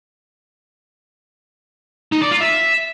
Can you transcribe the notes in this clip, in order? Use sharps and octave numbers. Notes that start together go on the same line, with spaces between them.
D#4
D5
F4
E5